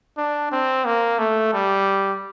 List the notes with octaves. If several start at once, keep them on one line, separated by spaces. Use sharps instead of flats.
D4
C4
A#3
A3
G3